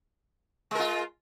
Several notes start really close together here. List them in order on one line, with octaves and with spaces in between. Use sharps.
G#3 A#4 F4